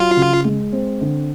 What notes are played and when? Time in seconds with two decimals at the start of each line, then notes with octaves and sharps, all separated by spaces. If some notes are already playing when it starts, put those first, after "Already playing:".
Already playing: F#3 F4
0.17 C#3
0.45 G#3
0.72 C4
1.01 D3